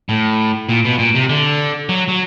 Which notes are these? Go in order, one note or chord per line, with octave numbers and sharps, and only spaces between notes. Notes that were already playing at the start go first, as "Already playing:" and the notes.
A2
A#2
B2
A#2
C3
D3
F#3
F#3